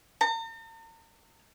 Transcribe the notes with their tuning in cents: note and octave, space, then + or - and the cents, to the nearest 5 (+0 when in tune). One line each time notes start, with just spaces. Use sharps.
A#5 -45